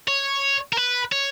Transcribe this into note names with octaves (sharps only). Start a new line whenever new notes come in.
C#5
A#4
B4
C#5